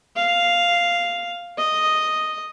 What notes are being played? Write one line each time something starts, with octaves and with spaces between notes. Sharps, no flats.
F5
D#5